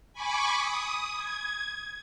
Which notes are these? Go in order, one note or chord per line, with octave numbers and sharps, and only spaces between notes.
G#5 B5 C#6 D6
D#6
G#6